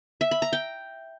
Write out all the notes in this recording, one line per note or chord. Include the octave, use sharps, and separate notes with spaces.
E5
B5
A#5
G5